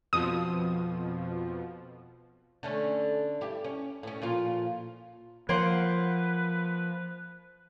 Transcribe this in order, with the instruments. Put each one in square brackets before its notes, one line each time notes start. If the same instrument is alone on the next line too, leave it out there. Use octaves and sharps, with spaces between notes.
[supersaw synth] F2 B2 F3 [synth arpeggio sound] D#6
[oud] D3 A3 C#4
G2 E4 G4
C#4
A2 C#4
A#2 F3 F4
[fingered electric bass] F3 [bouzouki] A#3 C5 F#5 [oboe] B4